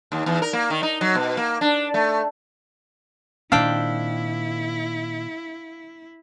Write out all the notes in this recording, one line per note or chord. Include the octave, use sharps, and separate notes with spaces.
D#2
E2
A#4
A#3
D#3
D#4
F#3
B2
A#3
D4
A3
A#2 D#3 C4 D4 E4 F5 G5 E6